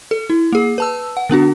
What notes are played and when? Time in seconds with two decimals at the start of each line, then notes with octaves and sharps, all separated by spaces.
0.11 A4
0.30 E4
0.52 A#3 G#4
0.78 B4 A5 E6
1.17 F#5
1.29 D3 B3 D4 F#4